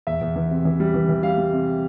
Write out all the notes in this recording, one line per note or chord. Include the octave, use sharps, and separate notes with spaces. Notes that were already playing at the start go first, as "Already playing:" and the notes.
E2 E5
E2
E3
C3
E3
G3
E3
E3
G3 F5
G3
C3